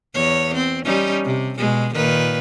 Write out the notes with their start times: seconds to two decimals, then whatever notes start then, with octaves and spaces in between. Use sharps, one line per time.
0.15 E2 C#5
0.55 C4
0.85 G3 C#4 D#4
1.25 C3
1.58 B2 G#3
1.94 A#2 D#3 B4